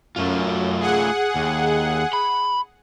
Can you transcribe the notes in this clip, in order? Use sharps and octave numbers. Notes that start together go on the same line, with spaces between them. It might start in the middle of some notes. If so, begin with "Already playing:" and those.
F#2 A3 F4
G#4 F#5
D#2
B5